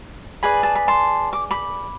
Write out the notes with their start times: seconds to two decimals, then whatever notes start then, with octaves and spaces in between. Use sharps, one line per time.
0.43 G#4 B4 D5 G#5 B5
0.63 A5
0.75 B5
0.88 A5 C6
1.33 D6
1.51 B5 D6